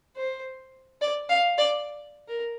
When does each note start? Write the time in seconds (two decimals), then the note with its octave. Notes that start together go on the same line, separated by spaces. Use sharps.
0.16 C5
1.02 D5
1.29 F5
1.58 D5
2.28 A#4